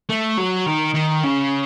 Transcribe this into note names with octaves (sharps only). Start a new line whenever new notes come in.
A3
F#3
D#3
D#3
C#3